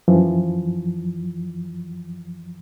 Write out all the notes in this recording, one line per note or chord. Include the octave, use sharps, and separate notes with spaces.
F#2 E3 F3